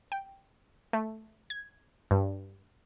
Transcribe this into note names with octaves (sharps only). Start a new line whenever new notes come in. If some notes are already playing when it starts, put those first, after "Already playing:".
G5
A3
G#6
G2